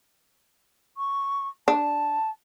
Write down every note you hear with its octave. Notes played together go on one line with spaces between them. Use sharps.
C#6
D4 A5